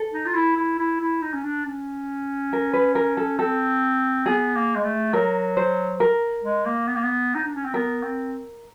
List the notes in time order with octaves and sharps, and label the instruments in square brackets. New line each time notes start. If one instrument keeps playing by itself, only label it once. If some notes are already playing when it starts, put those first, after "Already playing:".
Already playing: [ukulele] A4
[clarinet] D#4
F4
E4
E4
E4
E4
D#4
C#4
D4
C#4
[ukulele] A#4
B4
A#4
A4
[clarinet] C4 [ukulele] A4
[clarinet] B3 [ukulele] G#4
[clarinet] A#3
G#3
A3
[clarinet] F#3 [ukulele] A#4
[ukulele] C5
A#4
[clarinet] G#3
A#3
B3
A#3
B3
D#4
D4
C#4
C4
[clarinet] B3 [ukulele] A#4
[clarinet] C4